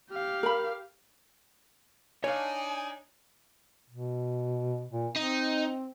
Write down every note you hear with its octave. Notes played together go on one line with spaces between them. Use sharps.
G4 F5
A#4 B5
D4 D#4 C#5 F5 G#5
B2
A#2
C4 D#4